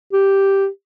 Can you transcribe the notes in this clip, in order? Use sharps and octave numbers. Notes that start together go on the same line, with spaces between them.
G4